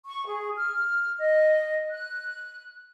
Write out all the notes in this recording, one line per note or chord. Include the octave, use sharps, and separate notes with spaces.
C#6
G#4
F6
D#5
F#6